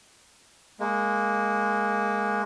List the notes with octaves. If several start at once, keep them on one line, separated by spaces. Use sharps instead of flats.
G#3 A#3